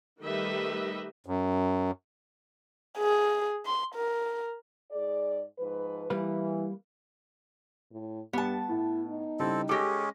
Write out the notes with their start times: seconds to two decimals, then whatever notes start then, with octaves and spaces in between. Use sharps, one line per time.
0.21 D#3 G3 A3 B4 D#5 E5
1.26 F#2
2.98 G#4
3.66 C6
3.95 A#4
4.91 G#2 G#4 D5
5.59 G#2 F3 B4
6.10 E3 G3 A#3 B4
7.91 A2
8.33 G2 G3 B3 A5
8.69 A2 E4
9.08 D#4
9.40 C#3 G3 C4 E4 A4
9.69 G#3 C#4 G4 A4 D6 A#6